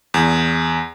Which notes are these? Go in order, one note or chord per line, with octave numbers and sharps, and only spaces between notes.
E2